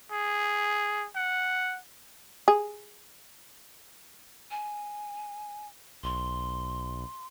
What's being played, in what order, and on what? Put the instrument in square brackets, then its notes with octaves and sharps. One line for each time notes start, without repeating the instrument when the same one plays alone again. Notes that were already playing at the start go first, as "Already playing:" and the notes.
[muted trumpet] G#4
F#5
[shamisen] G#4
[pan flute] G#5
[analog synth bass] B1 [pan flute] C6